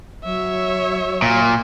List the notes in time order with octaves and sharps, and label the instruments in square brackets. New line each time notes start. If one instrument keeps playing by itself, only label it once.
[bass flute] F#3 [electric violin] C#5 E5
[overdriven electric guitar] A#2